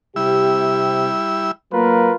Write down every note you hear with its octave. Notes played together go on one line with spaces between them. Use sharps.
C3 G3 E4 G4 E6
F#3 A#3 F4 A#4 B4